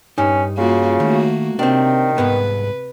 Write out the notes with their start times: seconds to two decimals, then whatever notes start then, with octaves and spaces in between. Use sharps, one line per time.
0.18 G2 C#4 D#4
0.58 C#3 A#3 F4 F#4
1.00 D#3 A3 A#3 F#4
1.59 C3 D#3 C4 D4
2.18 C2 G#2 B3 B4